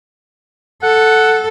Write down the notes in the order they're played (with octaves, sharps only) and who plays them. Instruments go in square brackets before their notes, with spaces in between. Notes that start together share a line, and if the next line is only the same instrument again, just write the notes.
[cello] A4 [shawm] F#5